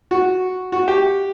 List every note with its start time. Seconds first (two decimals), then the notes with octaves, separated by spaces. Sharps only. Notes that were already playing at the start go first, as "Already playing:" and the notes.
0.11 F#4
0.72 F#4
0.88 G4